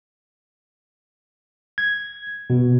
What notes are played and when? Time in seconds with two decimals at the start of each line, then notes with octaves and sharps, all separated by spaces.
1.78 G#6
2.50 B2